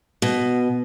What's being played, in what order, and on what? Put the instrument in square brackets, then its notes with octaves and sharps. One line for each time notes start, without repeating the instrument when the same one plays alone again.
[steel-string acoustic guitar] B2